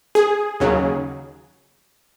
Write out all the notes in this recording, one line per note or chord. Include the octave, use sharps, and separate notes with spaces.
G#4
D#2 C#3 F#3